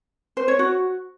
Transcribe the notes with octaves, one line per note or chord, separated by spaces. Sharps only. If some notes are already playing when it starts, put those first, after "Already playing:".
C5
C#5
F#4